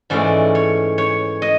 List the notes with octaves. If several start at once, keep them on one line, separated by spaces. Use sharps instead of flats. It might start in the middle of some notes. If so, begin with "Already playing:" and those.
G#2 E3 A3 C#4 D5
C#5
C#5
D#5